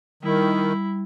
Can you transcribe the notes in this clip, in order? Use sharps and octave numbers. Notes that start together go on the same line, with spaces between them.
D#3 G3 E4